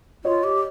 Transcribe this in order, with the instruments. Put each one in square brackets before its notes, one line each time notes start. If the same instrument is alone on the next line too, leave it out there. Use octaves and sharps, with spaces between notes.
[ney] F4 [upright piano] C#5 D#5
[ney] G4